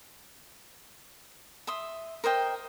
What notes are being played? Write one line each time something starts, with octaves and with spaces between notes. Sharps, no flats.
E5 C6 D#6
A#4 C5 D#5 G5